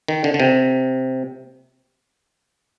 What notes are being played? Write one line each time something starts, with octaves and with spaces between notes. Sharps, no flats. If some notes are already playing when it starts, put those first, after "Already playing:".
D#3
D3
D3
C3